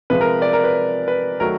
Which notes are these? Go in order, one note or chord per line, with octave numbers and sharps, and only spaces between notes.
C3 F3 G#3 B4
A#4
D5
A#4
B4
B4
D#3 F#3 A3 A#4